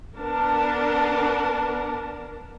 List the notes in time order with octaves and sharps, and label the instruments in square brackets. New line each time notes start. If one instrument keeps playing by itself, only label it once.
[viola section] B3 D4 A#4 A5